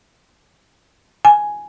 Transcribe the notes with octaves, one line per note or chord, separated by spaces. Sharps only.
G#5